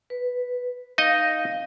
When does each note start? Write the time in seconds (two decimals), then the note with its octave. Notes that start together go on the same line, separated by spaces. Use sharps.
0.10 B4
0.98 D#4 D#5 F5